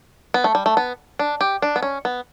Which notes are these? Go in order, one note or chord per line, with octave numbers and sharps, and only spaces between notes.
B3
A3
G3
A3
B3
D4
G4
D4
B3
C#4
B3